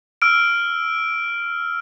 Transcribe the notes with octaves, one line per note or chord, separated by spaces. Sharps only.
E6 F6 D7